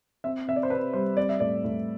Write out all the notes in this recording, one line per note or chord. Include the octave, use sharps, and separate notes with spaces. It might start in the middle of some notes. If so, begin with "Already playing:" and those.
C4 E5
C3 E5
D5
C5
C3 B4
G3 C5
C4 D5
E5
A2 D5
A2